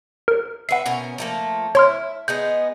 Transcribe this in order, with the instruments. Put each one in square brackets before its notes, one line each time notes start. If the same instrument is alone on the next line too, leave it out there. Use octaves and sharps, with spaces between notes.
[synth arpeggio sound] A#4
[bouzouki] B4 E5 [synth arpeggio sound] F#5 C7
[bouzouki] B2 C#4 A#4
F3 A3 A#3
[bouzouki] E4 [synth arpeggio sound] C#5 C6 F6
[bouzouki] G#3 B3 D#4 [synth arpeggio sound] G6